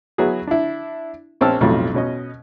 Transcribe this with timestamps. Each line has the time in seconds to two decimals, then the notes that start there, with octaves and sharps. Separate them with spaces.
0.18 F#3 B3 E4 F#4 G#4
0.47 D4 E4
1.41 A#1 C4 C#4 A5 E6 F6
1.61 B1 F2 A2 F#3 G3
1.94 B2 C#4 D#5